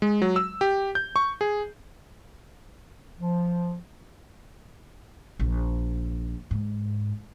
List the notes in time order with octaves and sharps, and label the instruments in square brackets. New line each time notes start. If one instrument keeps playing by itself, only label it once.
[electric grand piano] G#3
F#3
E6
G4
G6
C#6
G#4
[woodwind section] F3
[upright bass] A#1
G#2